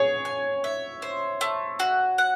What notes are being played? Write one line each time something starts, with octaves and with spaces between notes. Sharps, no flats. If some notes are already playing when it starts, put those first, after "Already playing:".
Already playing: G#4 C#5
G#5
E5
C5
A3
F#4
F#5